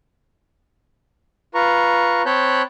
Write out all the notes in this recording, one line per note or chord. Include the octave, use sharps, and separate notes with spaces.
F4 B4 A#5 C#6
C4 C#5 A5 B5 F#6 G6